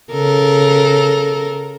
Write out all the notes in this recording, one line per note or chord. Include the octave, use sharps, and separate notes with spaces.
C#3 A4 A#4